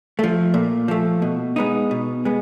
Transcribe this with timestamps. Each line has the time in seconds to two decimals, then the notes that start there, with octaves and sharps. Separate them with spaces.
0.19 F3 A3
0.54 A#2
0.88 F3 A3
1.22 B2
1.56 G#3 B3 D#4
1.91 B2
2.25 G#3 B3